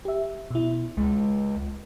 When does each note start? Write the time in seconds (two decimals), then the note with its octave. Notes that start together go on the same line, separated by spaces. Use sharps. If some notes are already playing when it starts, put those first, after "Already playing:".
0.05 G4 E5
0.51 B2 E4
0.97 C#2 G#3